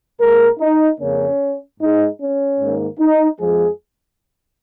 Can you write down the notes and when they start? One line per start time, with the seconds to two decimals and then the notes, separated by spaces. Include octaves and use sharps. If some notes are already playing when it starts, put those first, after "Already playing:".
0.19 A#2 G#3 A#4
0.59 D#4
0.99 F2 C#3 A#3 C#4
1.79 G#2 G#3 D#4
2.19 C#4
2.59 G#2 D#3 A#3
2.99 D#4
3.39 F2 F3 G#3 G#4